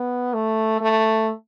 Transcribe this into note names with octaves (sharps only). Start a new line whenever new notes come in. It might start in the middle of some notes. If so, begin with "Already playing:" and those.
Already playing: B3
A3
A3